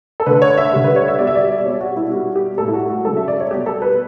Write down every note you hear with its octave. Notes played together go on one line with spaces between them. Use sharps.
A4
D3 A3 B4
C#5
E5
D3 G3
B4
C#5
E5
B2 G3 D5
E5
D5
D5
B2 G3 C#5
F#4
E4
B2 G3 F#4
G4
A2 G3 A4
E4
F#4
F#4
C#3 F#3 A3 A4
E5
D5
C#5
B2 G3 G4
A4
B4